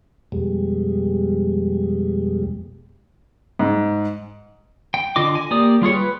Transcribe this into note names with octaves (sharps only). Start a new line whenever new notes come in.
F2 B2 G3 G#3
G#2
G5
D3 F4 D#5 D6
G#5
A#3 G4 D5 D#6
G3 F4 G#4 C#5
B4